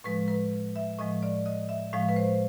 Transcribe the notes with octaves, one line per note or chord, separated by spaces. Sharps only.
A2 F3 G#3 B4
B4
E5
A2 F3 G#3 D#5
D5
D#5
E5
A2 F3 G#3 F5
B4
C5